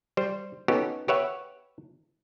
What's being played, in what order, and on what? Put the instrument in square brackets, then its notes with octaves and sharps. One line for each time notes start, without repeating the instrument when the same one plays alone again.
[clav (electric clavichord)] G3 C5
B3 C#4 D#4 F#4 G4 A4
G4 B4 C#5 E5 F#5